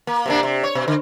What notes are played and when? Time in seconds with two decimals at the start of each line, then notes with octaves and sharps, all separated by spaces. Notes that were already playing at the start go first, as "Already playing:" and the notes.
0.07 A#3
0.26 C3 A#3 D4
0.43 C3
0.63 C#5
0.75 B2
0.88 D3